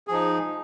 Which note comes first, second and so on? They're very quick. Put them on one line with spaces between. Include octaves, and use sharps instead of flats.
G#4 F3 D#4